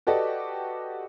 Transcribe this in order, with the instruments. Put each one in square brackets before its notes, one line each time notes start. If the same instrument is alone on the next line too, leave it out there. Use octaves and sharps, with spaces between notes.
[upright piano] F#4 G4 A4 B4 D5 D#5